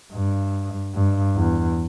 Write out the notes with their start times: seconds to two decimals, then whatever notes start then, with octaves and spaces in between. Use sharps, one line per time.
0.13 G2
0.95 G2
1.36 E2